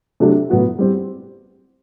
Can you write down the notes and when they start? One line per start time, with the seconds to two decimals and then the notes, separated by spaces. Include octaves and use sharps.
0.20 C3 F#3 A3 D4 F#4
0.50 A2 F#3 B3 F#4
0.79 G3 C4 G4